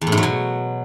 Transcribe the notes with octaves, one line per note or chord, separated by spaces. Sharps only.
E2
A2
G#2
F#3
B2